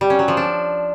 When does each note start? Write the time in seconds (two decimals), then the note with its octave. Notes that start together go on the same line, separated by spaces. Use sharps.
0.01 G3
0.10 C#4
0.19 F#3
0.28 F3
0.37 D4